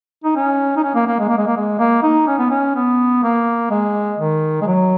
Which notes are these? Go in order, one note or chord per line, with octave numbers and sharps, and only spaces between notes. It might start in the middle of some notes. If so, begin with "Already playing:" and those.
D#4
C#4
D#4
C#4
A#3
A#3
G#3
A#3
G#3
A#3
G#3
A#3
D#4
C#4
B3
C#4
B3
A#3
G#3
D#3
G#3
F#3